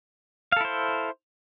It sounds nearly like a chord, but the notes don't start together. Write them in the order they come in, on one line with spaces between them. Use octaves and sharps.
F5 A4 E4 C5